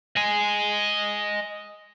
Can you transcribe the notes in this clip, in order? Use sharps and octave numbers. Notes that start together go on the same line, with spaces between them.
D#5 G#5